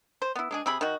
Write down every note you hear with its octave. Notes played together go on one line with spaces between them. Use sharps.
C5
B3 E4
G#3 D4 G#4
C3 G#4 B5
D#3 F#4